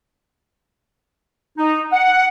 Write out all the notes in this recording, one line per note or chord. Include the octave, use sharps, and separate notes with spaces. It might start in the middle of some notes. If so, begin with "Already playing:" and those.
D#4
F#5